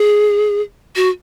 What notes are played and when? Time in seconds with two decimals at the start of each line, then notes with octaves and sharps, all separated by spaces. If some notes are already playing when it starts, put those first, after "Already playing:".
Already playing: G#4
0.96 F#4